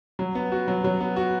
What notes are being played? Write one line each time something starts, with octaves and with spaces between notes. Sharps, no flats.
F#3
B3
F#4
F#3
F#3
B3
F#4